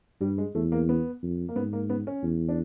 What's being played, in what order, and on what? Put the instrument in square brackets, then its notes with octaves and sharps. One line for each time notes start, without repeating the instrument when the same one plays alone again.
[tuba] G2 [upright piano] G3
[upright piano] G#3
[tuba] E2 [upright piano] A3
[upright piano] A#3
B3
[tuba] F2
[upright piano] A#3
[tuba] G#2 [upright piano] B3
[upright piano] A#3
B3
C#4
[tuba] E2
[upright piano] D4